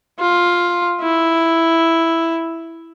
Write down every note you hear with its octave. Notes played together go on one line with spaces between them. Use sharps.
F4
E4